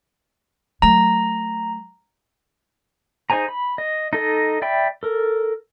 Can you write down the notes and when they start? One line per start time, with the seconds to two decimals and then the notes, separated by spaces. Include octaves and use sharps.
0.82 F#3 A3 A#5
3.30 D#4 G#4 C5 G#5 A#5
3.48 B5
3.78 D#5
4.13 D#4 A4 D#5
4.62 D5 E5 G5 B5
5.03 A4 A#4